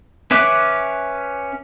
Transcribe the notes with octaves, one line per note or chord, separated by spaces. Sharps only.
C#4 B4 E5 D6 F#6